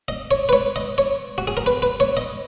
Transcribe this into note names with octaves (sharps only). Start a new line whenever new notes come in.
D#5
C#5
B4
C#5
D#5
C#5
F#4
G#4
A#4
B4
B4
C#5
D#5